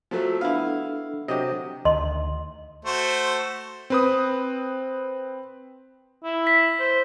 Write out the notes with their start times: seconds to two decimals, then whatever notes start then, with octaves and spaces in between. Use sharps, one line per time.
0.11 F3 F#3 A3
0.41 B3 D4 E4 A4 F5
1.28 C3 F#3 G4 D#5
1.85 D2 D#3 D#5 C6
2.85 A3 F#4 C5
3.90 C4 B4 D#6
6.24 E4
6.47 B6
6.80 C5